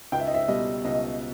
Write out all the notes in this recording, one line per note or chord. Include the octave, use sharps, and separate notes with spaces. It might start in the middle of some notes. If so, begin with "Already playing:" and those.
C#2 G5
E5
D#5
E5
B2 G3 D#5
C#2 D#5